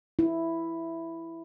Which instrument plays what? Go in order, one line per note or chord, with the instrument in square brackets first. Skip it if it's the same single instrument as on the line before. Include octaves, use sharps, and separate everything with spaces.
[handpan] E4